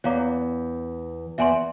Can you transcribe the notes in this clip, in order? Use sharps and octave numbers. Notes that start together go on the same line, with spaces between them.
E2 C#5 F5 A#5 D6
E2 E5 G#5 C6